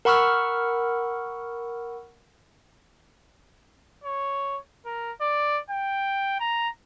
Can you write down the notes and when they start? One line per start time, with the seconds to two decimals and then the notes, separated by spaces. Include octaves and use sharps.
0.05 A#4 F#5 B5 C#6 E6 F6
4.04 C#5
4.86 A#4
5.21 D5
5.70 G5
6.39 A#5